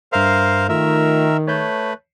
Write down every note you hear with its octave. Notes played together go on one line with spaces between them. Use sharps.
G2 A#4 C5 E5 F5
D#3 A3 F4 A#4 E5
A3 B4 C#5 A5 G6